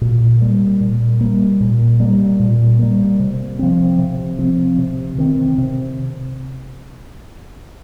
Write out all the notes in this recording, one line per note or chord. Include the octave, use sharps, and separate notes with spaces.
A#2
G3 A#3
A#2
G3 A#3
A#2
G3 A#3
A#2
G3 A#3
C3
F3 C4
C3
F3 C4
C3
D#3 C4
C3